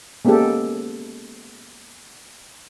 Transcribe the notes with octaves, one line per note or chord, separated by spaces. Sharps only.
G#3 A#3 B3 C#4 G4 A4